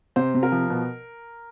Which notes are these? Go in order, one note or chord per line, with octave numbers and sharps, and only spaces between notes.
C3 C5
C3
A#4
F3
B2